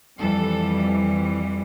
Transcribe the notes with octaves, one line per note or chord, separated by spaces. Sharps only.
F2 E3 G3 A4